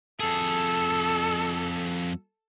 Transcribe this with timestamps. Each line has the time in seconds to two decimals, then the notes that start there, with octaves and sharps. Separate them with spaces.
0.20 F2 G#4 A4